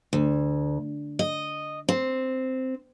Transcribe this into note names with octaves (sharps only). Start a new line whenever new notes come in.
D2
D#5
C4